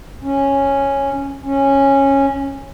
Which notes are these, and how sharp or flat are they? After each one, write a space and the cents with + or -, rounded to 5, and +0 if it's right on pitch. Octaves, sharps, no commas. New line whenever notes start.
C#4 -5
C#4 -10